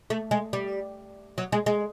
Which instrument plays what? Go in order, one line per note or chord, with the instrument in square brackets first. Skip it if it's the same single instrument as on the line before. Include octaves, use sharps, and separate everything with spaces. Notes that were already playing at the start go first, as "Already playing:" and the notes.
[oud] A3
G#3
G3
F#3
G#3
G#3